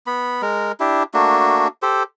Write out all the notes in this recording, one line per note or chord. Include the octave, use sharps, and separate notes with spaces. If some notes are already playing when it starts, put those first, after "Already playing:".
B3 B5
G#3 A#4
D4 E4 G4
A3 A#3 D4 F#4
G4 A4 C5